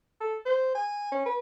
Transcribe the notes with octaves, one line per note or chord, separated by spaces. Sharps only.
A4
C5
G#5
C#4
B4